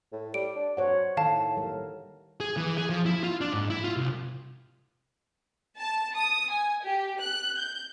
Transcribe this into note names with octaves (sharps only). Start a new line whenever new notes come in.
A2
G3 D7
D4
F#3 C5 C#5 F#5
A2 D#3 F5 A5
G3 A#4
G#4
E3
G#4
F3
E4
F4
D4
G#2
E4
F4
C2
A5
D#6
G#5
G4
F#6
G6